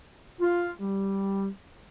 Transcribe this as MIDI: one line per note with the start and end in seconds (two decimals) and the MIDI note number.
0.40 0.72 65
0.80 1.48 55